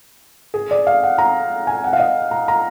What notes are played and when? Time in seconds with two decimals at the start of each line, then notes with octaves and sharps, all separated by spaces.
0.54 G#4
0.71 D5
0.87 F5
1.03 F#5
1.18 A#5
1.67 G#5
1.84 F#5
1.93 F5
1.99 D#5
2.31 A#5
2.48 A#5